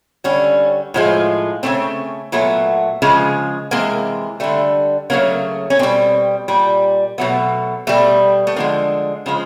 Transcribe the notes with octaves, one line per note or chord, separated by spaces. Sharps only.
D3 G3 C#4
A2 F3 G#3
C#3 F3 A3 C4
A#2 F#3 A3 B3
C#3 F3 G#3
C3 E3 G#3 A#3
D3 G3 A3
C#3 F#3 A3 A#3
C#4
B2 G3 C4
A#2 G3
B2 F#3 A3 B3
B2 G3 A3
A3
D3 F3 G#3 A#3
C#3 F3 G#3